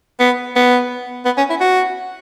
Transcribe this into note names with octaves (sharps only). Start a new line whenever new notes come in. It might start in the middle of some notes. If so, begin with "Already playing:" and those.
B3
B3
B3
C#4
E4
F#4